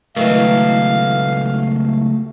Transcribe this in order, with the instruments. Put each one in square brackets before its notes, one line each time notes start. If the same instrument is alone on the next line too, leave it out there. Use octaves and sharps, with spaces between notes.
[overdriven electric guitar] C#2 F#3 [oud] D#3 E3 [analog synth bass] A3 [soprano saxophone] F5